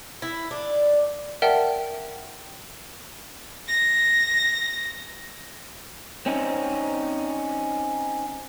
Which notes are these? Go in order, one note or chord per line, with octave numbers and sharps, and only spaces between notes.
E4
D4
A#4 D5 E5 F#5 G5 A5
A#6
C4 C#4 D#4